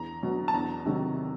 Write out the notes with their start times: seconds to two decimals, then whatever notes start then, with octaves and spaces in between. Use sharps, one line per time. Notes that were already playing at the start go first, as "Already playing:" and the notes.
Already playing: E2 A#5
0.23 B2 F#3
0.48 A5
0.54 E2 A#5
0.86 C3 D#3 F#3